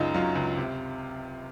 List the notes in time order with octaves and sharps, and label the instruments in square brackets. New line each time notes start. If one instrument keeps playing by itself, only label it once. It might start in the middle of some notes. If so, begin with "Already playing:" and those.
Already playing: [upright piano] C#2 F#2 C#3 D#4 F4
F#3 F4
C#2
C3